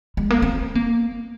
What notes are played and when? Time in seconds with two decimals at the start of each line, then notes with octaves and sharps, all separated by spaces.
0.17 G#3
0.30 A#3
0.42 C4
0.75 A#3